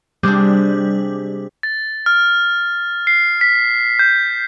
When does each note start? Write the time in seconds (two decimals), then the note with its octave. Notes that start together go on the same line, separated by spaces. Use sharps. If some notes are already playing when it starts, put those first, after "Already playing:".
0.23 C3 G3 G#3 D4
1.63 A6
2.06 F6
3.07 C7
3.41 B6
3.99 G6